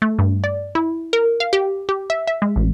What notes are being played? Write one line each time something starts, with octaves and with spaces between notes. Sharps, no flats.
A3
G2
D5
E4
A#4
F5
G4
G4
E5
E5
G#3
A1